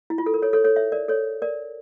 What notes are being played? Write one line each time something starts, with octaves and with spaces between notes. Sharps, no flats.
E4
F4
A4
A#4
A4 C#5
A4 C#5
A4 C#5
C#5 E5
A#4 D5
A4 C#5
A#4 D5